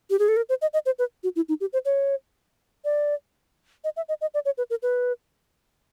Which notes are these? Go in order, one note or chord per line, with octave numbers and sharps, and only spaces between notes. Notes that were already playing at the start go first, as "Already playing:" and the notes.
G4
G#4
A4
A#4
C5
D#5
D#5
C5
B4
F#4
E4
D#4
G4
C5
C#5
D5
D#5
E5
D#5
D#5
D5
C#5
B4
A#4
B4